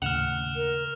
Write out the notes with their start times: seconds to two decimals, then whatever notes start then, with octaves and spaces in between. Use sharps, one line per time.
0.02 D#2 A2 C#3 F#5 F6 E7 F7
0.56 A#4